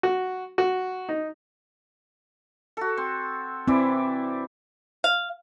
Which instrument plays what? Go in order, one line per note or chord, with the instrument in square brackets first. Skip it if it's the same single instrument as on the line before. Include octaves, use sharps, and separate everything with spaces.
[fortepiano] F#4
F#4
D#4
[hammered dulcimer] F#4 A4
C4
[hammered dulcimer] E3 E4 D5 [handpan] C4
[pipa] F5